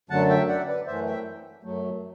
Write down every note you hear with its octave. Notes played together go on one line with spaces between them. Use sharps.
F#2 D3 F#3 A3 F#5 A5
E5 G5
D5 F#5
B4 D5
F#2 E3 A3 C5 E5
E5 G5
F#2 F#3 A3